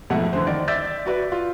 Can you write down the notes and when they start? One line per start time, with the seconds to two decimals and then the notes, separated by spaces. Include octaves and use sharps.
0.10 F2 G#2 B2 A3 E4 F#5
0.33 D3 E3 C5
0.47 D#3 D5
0.68 D5 E5 E6 G6 A6 B6
1.06 F#4 B4 D5
1.32 F4